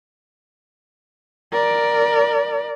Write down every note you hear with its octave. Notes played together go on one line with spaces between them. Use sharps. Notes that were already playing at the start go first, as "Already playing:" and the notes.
A#4 D5